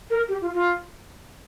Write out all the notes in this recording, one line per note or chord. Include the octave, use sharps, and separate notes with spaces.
A#4
G4
F4
F4